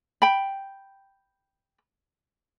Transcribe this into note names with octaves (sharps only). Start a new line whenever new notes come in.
G5 B5